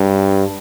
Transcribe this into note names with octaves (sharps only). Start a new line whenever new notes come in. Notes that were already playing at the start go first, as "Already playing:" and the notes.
Already playing: G2